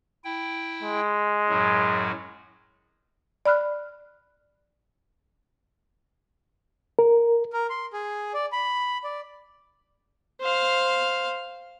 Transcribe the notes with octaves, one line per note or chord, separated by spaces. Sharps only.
E4 G5
G#3
F#2 A2 F#3
D5 B5 F6 F#6
A#4
A#4
C6
G#4
D5
B5
D5
C5 F5